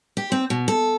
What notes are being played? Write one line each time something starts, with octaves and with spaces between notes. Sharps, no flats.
G4
C4
B2
A4